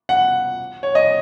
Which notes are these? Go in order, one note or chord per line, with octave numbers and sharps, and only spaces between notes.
F#5
C#5
D#5